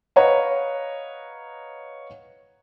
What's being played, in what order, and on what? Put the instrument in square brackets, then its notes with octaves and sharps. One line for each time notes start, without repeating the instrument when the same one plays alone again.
[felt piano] B4 C#5 D#5 F5 F#5 A#5